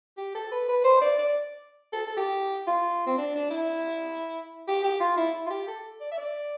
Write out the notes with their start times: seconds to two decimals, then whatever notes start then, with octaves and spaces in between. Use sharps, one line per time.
0.17 G4
0.35 A4
0.51 B4
0.68 B4
0.84 C5
1.01 D5
1.18 D5
1.93 A4
2.07 A4
2.17 G4
2.67 F4
3.07 C4
3.18 D4
3.35 D4
3.50 E4
4.68 G4
4.84 G4
5.00 F4
5.17 E4
5.46 F4
5.50 G4
5.68 A4
6.01 D5
6.11 E5
6.17 D5